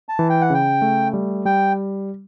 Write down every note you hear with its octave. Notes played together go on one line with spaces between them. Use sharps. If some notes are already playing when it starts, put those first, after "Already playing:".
A5
E3
G5
F#5
C#3 G5
A3
G3
G3 G5